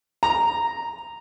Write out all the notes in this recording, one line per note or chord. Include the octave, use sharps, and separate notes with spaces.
A#5